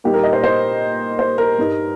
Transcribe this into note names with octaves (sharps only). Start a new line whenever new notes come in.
A#2 G3 A#3 D#4 G4
A#4
D#5
C5
C5
C5
A#4
G2 G3 D#4